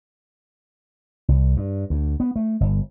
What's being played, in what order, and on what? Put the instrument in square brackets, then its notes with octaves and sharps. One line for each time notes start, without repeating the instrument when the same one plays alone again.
[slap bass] C2
G2
D2
B3
A3
G1